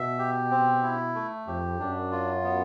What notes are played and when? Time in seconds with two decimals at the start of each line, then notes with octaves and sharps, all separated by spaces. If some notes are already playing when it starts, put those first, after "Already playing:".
Already playing: B2 E5
0.19 G4
0.50 C4
0.83 E4
1.15 A3
1.47 F2 G4
1.79 F#2 D4
2.11 F4
2.44 B3